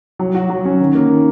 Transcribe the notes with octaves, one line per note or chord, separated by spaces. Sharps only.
F#3
F#4
F#3
C#4
D#3
A#3
D#3